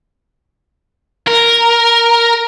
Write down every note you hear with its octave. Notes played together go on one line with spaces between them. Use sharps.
A#4